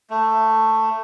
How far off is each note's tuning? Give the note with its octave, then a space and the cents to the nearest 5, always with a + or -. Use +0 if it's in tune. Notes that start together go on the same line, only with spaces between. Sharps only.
A3 +10